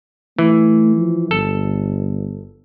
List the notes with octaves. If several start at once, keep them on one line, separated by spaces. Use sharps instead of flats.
E3 A3
F3
G1 A4